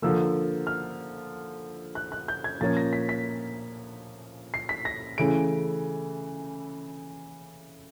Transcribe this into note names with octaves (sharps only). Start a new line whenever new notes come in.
D3 F3 A#3 E6
F6
F#6
F#6
G6
G#6
A#2 F3 A#3 C#4 A6
A#6
B6
B6
C7
B6
A#6
C#3 E3 A3 D7